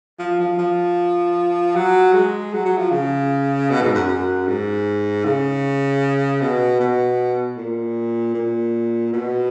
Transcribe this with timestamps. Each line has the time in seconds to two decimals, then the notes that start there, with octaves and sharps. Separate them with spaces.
0.19 F3
0.40 F3
0.58 F3
1.75 F#3
2.13 G#3
2.53 F#3
2.65 F#3
2.78 F3
2.91 C#3
3.70 B2
3.82 G#2
3.94 F#2
4.08 F#2
4.47 G#2
5.24 C#3
6.41 B2
6.80 B2
7.57 A#2
8.34 A#2
9.13 B2